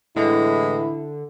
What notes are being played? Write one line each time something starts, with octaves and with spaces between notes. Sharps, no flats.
A2 D3 E3 G#3 E4